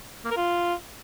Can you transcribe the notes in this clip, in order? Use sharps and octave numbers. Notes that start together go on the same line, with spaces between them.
A#3
A#4
F4